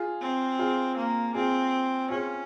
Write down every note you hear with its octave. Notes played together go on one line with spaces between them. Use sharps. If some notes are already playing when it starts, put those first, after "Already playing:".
Already playing: F4 G#4
C4
F4 G#4
A#3
C4 F4 G#4
C#4 F4 G#4